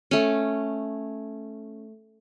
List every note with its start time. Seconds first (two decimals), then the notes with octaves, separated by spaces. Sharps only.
0.11 A3 C#4